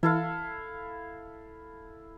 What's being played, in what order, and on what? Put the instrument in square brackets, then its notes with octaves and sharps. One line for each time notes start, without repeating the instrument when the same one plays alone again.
[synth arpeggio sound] E3 [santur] E4 A4 F5